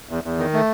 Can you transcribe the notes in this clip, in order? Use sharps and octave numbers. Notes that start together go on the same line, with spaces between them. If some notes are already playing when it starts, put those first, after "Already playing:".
E2
E2
D#3
A3